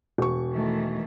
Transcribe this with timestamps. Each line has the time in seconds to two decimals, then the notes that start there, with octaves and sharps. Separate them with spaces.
0.18 E1 C#6
0.53 D#3 E3 A3